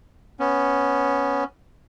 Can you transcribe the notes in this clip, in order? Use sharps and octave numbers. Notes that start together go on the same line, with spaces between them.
B3 C#4